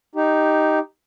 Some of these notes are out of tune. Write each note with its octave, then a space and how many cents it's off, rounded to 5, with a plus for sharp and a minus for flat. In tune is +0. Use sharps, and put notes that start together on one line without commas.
D#4 +0 G4 -5